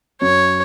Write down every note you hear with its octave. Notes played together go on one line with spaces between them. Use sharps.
F#2 C#5